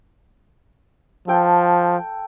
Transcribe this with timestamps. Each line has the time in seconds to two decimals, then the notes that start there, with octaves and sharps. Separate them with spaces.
1.28 F3 A4 G5 A5